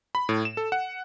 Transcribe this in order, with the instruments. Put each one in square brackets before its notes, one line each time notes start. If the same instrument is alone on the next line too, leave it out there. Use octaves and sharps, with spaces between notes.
[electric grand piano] B5
A2
E7
A4
F#5